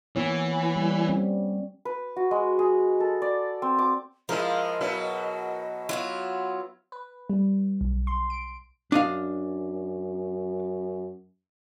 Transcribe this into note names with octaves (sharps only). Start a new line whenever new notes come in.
E3 A#3 B3 C#5
G3
G3 C4 C#4
B4
F#4
G#3
G#4
A4
D5
C4
D6
F3 G#3 E4 A#4 D#5
B2 F#3 E4
F#3 B3 E4 F4
B4
G3
B1
C6
D7
F#2 D4 D#5 F5